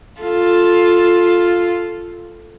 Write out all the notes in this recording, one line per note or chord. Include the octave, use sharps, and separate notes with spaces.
F4 A4